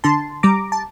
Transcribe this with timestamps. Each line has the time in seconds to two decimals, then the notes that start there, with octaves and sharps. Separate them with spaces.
0.04 D3 A5 C6
0.43 G3 A#5 D6
0.72 A5